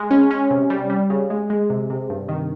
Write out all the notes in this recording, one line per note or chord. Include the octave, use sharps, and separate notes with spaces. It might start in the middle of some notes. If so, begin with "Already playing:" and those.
Already playing: G#3
C#4
C#4
C3
G3
G3
C#3
G#3
G#3
C3
C3
G2
D#3